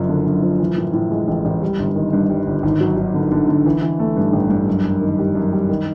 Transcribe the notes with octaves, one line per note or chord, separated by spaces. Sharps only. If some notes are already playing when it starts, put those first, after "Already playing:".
Already playing: F#1 F#2 F3
D3
F#2
F3
E3
A2
A2
G#3
A1
A1
G3
G1
D#3
G2
G3
G1
G#1
F#3
F#3
D3
D3
D3
E3
E3
A3
G2
A1
G2
F#2
F#2
D#3
G3
F#2
G3
D#3